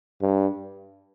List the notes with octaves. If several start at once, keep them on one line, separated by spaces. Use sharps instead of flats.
G2